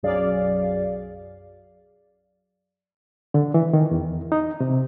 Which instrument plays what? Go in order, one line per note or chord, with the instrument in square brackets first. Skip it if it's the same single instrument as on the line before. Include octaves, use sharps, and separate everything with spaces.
[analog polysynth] B1 F#2 F#3 G#4 D5 F5
[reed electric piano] D3
E3
D#3
E2
D#4
C3